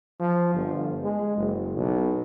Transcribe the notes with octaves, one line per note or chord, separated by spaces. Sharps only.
F3
G1
G#3
F#1
B1